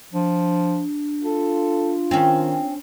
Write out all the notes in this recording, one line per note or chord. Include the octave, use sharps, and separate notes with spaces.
F3 D4
F4 A4
D#3 C4 C#4